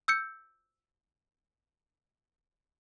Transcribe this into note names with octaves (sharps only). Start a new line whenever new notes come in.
E6 G6 C#7